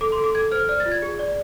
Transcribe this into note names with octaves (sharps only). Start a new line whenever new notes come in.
A4 D6
C6
A4
D6
A4 G#6
C5 F6
D5 F6
A6
F4
G#6
G#4
D5